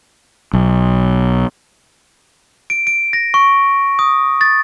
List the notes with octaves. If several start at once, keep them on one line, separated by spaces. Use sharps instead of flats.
B1
D7
D7
A#6
C#6
D#6
A6